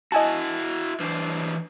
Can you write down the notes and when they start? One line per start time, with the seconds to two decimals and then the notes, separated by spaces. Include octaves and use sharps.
0.12 E4 F#4 D#5 G#5 A5
1.00 E3 D4 C5